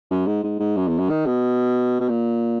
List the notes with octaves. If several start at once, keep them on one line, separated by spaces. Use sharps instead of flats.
F#2
G#2
G#2
G#2
F#2
E2
F#2
D#3
B2
B2
A#2